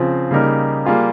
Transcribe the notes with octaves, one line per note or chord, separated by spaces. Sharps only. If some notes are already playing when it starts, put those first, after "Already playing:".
Already playing: C#3 F3 C4 F4
C#3 G3 A#3 D#4 A#4
G3 A#3 F4 G#4